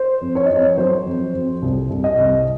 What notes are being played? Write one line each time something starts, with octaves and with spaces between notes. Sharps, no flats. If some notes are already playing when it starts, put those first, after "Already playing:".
Already playing: C5
F2
C#5
F2 D#5
C#5
F#3 C5
F2
F2
C2
C2
D#5
C2